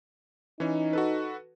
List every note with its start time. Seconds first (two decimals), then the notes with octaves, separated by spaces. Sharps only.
0.60 E3 C#4 D#4 C#5
0.93 F#4 A4 B4